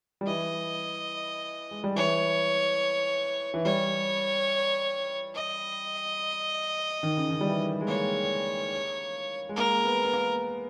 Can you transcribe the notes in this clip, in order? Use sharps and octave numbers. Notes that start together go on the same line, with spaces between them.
G3
E3 D#5
G#3
G3
E3 C#5
E3
G3 C#5
D#5
D#3
C#3
D#3
G3
E3
G#3
A#3 C#5
G#3
A#3 A#4
B3
B3
A#3